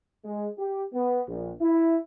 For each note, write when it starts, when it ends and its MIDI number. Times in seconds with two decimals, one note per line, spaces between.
0.24 0.49 56
0.58 0.84 67
0.93 1.22 59
1.28 1.52 34
1.61 1.96 64